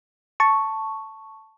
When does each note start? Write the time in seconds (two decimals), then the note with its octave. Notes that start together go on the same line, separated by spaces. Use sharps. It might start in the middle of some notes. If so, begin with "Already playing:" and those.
0.40 A5 C#6